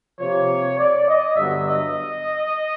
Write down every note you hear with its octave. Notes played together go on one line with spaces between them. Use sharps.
C3 F3 A#3 C#5
D5
D#5
G2 D3 F#3 B3 E5
D#5